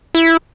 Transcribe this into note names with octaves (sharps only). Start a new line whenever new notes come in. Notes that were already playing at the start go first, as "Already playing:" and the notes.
E4